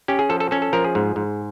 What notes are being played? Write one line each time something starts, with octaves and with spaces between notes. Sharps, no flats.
C#4 G4
G#4
F3 A4
A4
C#4 A4
A4
F3 A#4
G#4
G#2
G#2